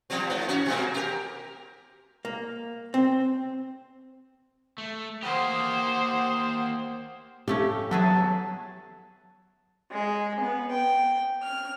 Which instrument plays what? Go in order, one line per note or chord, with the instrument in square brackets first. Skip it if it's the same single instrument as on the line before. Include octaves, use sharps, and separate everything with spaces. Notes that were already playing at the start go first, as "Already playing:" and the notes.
[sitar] F3 G3 C4
G#2 B3
C#4 F#4
B2 G#3 A#3
G4 A#4
[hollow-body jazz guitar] A#3
C4
[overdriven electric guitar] A3
[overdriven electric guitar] A#3 G4 [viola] C5 [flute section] F#5 D#6
[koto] F3 A3 C#4 [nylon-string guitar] G4
[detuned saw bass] F#3 [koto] B3 E4 G#4 [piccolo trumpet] A5
[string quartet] G#3
B3
G5
F6